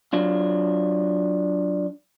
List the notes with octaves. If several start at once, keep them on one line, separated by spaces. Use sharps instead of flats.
F#3 D4 F4